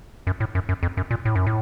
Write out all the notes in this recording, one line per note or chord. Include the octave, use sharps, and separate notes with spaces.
F#2
A2
F#2
F#2
F2
F#2
A#2
A2
F#2
A2